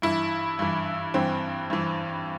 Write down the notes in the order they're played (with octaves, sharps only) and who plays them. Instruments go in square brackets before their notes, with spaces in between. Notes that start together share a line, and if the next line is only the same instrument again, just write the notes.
[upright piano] G2 E3 E4
G2 E3
G2 E3 C4
G2 E3